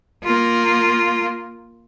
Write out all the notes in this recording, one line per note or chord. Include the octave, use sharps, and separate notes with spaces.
A#3 F4